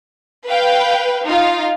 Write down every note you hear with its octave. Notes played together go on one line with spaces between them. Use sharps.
B4 F5 G5
D#4 F4 F5